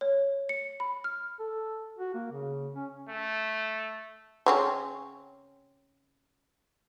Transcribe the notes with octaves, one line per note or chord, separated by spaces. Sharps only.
C#5
C#7
B5
F6
A4
F#4
A#3
C#3
C#4
A3
C#3 C4 C#4